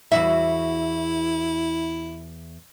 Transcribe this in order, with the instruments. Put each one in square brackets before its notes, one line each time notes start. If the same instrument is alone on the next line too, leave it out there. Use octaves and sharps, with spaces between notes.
[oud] E2 F#4 E5 [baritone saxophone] E4